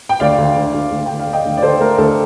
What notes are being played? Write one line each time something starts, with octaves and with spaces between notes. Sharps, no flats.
G5
D2 D5 F5
D2
D2
D2
D2
D2 G5
F5
A3
D#5 G5
D2
D5
D3 A4 C5
A3 A#4
D2 A4